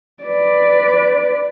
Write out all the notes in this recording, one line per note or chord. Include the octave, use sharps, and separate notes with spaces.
B4 D5